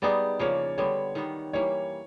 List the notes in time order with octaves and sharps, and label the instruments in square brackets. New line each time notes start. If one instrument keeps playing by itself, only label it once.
[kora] G3 B3 D#4 G#4 [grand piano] D5
[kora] C#3 F3 A#3 [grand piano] C#5
[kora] D3 G3 B3 [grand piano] C#5
[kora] D#3 G3 B3
[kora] E3 G3 A#3 [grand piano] C#5